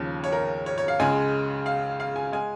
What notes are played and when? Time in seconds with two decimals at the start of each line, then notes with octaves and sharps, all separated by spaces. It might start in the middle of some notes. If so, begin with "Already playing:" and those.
Already playing: D#2 C#3 F3 C#5
0.24 C#5
0.32 A#4
0.66 C#5
0.78 C#5
0.88 F5
0.99 C#2 C#3 G#3 G#5
1.66 F5
2.00 F5
2.16 G#5
2.32 G#3 G#5